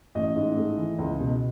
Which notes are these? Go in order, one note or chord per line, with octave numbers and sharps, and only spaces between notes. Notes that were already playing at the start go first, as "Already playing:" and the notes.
A1 D#5
G#2
A3
E3
C#2
B2